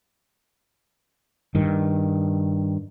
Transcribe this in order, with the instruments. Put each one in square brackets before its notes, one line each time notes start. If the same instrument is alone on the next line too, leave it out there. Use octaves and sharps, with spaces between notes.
[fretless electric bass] G2 D#3